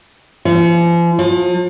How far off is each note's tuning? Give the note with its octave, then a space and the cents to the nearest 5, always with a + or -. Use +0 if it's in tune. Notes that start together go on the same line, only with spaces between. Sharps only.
F3 -40
F3 +40